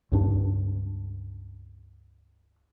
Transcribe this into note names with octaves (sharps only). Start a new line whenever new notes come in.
C#2 G2 D4